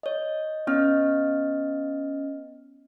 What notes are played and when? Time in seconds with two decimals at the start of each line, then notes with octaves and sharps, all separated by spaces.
0.03 C#5 D#5
0.67 B3 C#4 D#5 F6